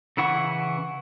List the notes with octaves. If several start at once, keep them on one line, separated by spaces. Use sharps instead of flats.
C#3 E3 E4 F#5 C#6